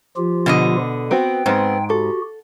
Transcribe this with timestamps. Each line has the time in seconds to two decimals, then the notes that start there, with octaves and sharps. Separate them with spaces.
0.17 F3 F4 G4
0.46 B2 D3 D#5
1.11 B3 C4 F#4 G5
1.46 G#2 G#3 B3 C4
1.90 F#4 G4 A4